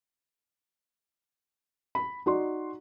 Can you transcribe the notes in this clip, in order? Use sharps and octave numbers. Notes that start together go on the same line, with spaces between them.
B5
D#4 F#4 D5 C6